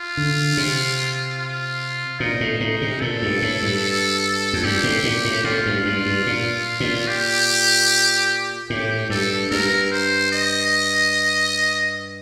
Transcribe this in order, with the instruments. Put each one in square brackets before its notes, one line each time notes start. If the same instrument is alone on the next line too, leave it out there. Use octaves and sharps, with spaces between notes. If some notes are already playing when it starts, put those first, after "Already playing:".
Already playing: [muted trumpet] F4
[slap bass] D3
C3
[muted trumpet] F4
[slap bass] A#2 [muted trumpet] D#4
[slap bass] A2
A2
C3
[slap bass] A#2 [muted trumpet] A4
[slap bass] G2
A2
G2
F2
[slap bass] G2 [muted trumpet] G4
[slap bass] A2
A#2
A2
[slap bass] A2 [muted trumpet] F4
[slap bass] G2
G2
G2
A#2
A#2
[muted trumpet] G4
[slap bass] A2 [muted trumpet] G4
[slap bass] G2 [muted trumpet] A4
[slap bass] G2 [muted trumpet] A#4
[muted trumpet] C5
D#5